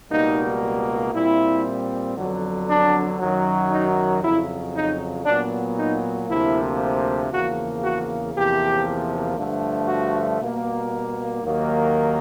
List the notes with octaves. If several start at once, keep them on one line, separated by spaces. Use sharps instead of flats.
C#2 B2 G3 A#3 D#4
A#2 G3 C4 E4
F2 D3 F#3 B3
D4
F#2 D#3 F#3
D#4
F2 C#3 F#3 E4
D#4
A#2 F#3 B3 D4
D#4
D2 C3 F3 A#3 E4
E2 C#3 F3 A#3 F#4
F#4
E2 C3 F3 A#3 G4
G2 D3 F3 A3
F#4
B2 G3 A#3
D#2 D#3 F#3 A#3